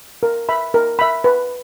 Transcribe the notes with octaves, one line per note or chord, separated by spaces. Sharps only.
A#4
E5 B5
A#4
E5 B5
B4